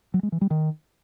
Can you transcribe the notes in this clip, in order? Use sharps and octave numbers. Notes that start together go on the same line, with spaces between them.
F#3
G#3
E3
G3
D#3